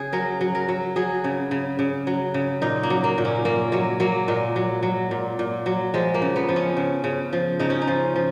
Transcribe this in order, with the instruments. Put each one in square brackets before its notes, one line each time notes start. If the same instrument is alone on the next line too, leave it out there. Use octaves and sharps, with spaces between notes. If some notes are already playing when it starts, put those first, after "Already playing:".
Already playing: [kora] C#3 G#4
F#3 A#4
F#3
A#4
F#3
F#3 G#4
C#3
C#3
C#3
F#3
C#3
A#2 D#4
A#3
F#3
A#3
A#2
C#4
A#2 A#3
F#3 G#3
F#3 A#3
A#2 G#3
F#3
F#3
A#2
A#2
F#3
F3 G#3
A#3
C#3
B3
F3
C#4
C#3
C#3
F3
C#3 D#4
C#4
D#4
F3
F3